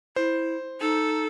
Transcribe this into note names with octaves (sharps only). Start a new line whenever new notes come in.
E4 C5
D#4 A4